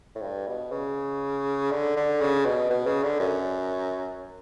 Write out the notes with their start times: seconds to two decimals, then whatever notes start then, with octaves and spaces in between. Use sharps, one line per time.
0.15 A2
0.22 G2
0.47 B2
0.72 C#3
1.71 D3
1.96 D3
2.21 C#3
2.45 B2
2.70 B2
2.87 C#3
3.03 D3
3.20 F#2